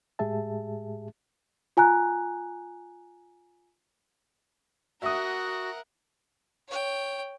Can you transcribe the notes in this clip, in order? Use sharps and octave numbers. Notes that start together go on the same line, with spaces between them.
A2 G#3 G4 G#4 E5 A5
F4 G#5 A#5 F#6
F#4 A#4 E5 F#5 D#6
C#5 G5